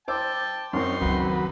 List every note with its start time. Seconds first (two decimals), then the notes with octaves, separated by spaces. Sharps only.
0.08 C5 G5 A5 D6 E6
0.73 F#2 C4 C#4 D#4 C6
1.01 C#2 D#3 F#3 B4